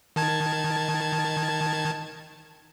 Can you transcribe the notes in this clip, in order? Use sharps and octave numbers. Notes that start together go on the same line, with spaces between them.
D#3 A5 G#6